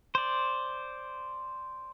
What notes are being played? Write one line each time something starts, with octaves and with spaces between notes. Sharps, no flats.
C5 D5